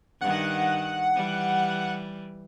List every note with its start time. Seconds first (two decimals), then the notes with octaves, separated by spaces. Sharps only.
0.21 G2 D#3 F#5
1.16 E3 G3